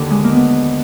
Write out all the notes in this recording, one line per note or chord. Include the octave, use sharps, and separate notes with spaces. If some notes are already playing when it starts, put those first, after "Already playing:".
Already playing: D#2 D3
G#3
A#3
B3